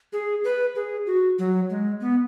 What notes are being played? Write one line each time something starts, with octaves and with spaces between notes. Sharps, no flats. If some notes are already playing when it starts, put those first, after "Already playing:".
G#4
B4
G#4
F#4
F#3
G#3
B3